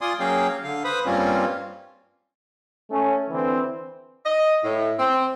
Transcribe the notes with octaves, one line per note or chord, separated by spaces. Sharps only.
F4 D5 G#5 C6 D#6
F#3 A#3 C#4 G#4 F5 G5
D3 F5
B4 C5 B5 D#6
G2 G3 A#3 C4 C#4 F4
A3 C#4
D3 E3 C4
D#5
A2
C4